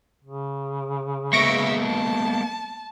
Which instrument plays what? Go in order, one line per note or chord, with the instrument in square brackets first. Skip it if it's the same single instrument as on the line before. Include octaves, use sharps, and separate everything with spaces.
[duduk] C#3
[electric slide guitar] G#3 A#3 B3 [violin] E5 [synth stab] C#6 A#6 D7
[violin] A5